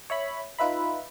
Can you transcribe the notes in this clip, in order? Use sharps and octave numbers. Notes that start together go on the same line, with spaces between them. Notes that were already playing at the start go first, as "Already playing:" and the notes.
C#5 E5 B5
D#4 F4 B4 E5 B5